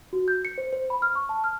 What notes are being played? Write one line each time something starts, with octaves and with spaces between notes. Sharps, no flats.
F#4
G6
C#7
C5
C5
B5
F6
C#6
A5
F6